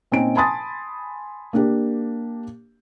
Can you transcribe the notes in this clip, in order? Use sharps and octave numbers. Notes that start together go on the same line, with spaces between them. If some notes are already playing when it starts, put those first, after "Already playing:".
A#2 C4 C#4 D#4 D7
G#5 A5 B5 C6 D#6 A6
A#3 D4 G4